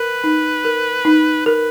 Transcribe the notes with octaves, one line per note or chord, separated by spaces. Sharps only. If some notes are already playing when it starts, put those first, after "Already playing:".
Already playing: A#4 B4
D#4
A#4
D#4
A#4 B4